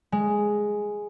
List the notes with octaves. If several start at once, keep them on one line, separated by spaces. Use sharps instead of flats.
G#3